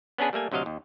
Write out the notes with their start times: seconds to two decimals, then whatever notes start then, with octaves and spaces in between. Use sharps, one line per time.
0.18 B3 C#4 D4 G#4 B4
0.33 G3 A3 A#3 G#5
0.52 D2 C3 F#3 D#5 F5
0.66 D#2